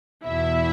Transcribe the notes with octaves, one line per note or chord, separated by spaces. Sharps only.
E2 B2 E4 E5